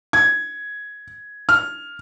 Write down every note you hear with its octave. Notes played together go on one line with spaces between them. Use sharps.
G#6
F6